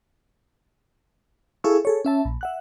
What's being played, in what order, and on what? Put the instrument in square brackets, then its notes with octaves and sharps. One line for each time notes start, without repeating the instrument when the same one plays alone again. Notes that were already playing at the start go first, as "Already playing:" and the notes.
[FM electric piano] E4 G#4 A4 F5 C#6 E6
G#4 A4 C#5
C#4 E5 A5
A#1
E5 F#5 F#6